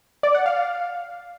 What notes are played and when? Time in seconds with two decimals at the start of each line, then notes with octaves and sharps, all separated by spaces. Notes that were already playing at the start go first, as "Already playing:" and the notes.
0.23 D5
0.35 F#5
0.46 F5